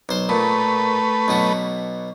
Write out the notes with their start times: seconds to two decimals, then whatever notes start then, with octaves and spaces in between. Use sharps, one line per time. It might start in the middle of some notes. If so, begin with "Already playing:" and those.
0.09 B1 C5
0.29 A#2 A3 B4
1.28 B1 B2 F#4